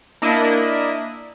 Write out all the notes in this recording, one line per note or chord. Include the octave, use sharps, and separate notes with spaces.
A#3 D4 E4 D#5